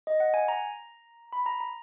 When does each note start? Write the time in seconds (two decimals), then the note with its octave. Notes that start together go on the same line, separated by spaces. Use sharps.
0.07 D#5
0.20 F#5
0.34 G#5
0.48 A#5
1.33 B5
1.46 A#5
1.60 A#5